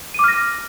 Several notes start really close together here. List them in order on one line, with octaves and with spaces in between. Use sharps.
D#7 D6 F6 A#6